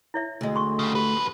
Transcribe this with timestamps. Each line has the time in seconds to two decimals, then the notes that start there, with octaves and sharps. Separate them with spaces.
0.14 E4 C#5 E5
0.41 D2 G#3
0.56 C6 C#6
0.79 C#3 G3
0.95 F2 G4 B4